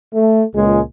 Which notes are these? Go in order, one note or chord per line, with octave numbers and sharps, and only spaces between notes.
A3
C#2 A#2 G#3 G#4